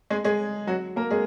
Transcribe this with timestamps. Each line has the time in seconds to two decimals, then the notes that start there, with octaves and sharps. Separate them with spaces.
0.10 G#3 G#4
0.24 G#3 G#4
0.67 F#3 F#4
0.96 A#3 A#4
1.10 G#3 G#4